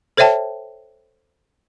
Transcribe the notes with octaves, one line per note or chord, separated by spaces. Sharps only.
A4 C5 C#5 E5 G5 A5